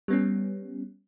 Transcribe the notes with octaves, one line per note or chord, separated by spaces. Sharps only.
G3 B3 C#4